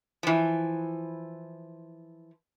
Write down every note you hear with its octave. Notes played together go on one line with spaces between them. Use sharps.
E3 F3